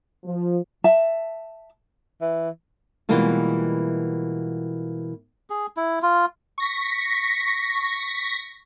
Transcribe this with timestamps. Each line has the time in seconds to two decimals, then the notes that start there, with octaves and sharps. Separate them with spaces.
0.24 F3
0.84 E5 A5
2.21 E3
3.09 B2 E3 G3 G#3 A#3 F4
5.50 G#4
5.77 E4
6.02 F4
6.58 C#6 A#6 B6